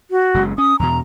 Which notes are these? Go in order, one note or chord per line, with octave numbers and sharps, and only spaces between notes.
F#4
F#1 C#3 G#3
C#4 D#6
E2 B2 A#5